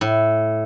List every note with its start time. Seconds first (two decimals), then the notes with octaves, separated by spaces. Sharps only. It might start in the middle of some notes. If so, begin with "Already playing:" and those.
0.01 A2